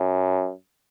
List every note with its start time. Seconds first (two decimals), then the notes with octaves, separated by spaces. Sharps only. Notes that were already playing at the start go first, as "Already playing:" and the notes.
Already playing: F#2